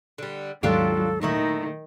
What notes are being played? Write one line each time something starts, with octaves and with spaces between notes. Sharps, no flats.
D3 G3
D#2 G#2 F#3 D4 F4 G4 A4
A#2 D#3 A3 D#4 E4